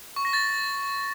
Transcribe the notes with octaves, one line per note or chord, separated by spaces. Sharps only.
C#6
A#6
A6